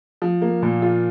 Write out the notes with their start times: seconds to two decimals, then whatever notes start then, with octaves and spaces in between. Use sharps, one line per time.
0.22 F3
0.42 A#3
0.62 A#2
0.82 F4